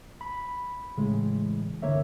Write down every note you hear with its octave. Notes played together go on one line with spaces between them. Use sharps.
B5
A2 C#3 E3 G#3
C2 G2 D3 A#3 C#5 E5